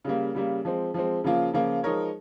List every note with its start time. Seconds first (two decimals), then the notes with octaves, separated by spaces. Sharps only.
0.05 C#3 G3 A#3
0.34 C#3 G3 A#3
0.65 F3 G#3 C4
0.94 F3 G#3 C4
1.24 C#3 F3 A#3 F4
1.53 C#3 F3 A#3 F4
1.83 F3 G#3 D#4 A#4 C#5